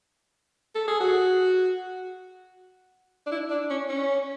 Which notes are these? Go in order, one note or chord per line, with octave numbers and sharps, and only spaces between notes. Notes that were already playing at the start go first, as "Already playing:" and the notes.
A4
G#4
F#4
D4
E4
D4
C#4
C#4